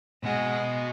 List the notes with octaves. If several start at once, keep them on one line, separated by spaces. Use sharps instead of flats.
B2 G#3 F#5